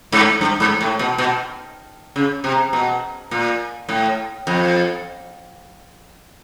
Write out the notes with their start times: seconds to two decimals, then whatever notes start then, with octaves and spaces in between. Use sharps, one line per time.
0.12 G#2
0.41 G2
0.60 G#2
0.81 A2
0.99 B2
1.18 B2
2.16 C#3
2.44 C3
2.73 B2
3.31 A#2
3.89 A2
4.47 F2